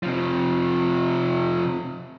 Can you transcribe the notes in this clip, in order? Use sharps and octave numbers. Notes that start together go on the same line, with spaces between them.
C3 F3